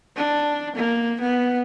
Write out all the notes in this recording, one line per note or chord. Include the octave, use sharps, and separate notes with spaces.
D4
A#3
B3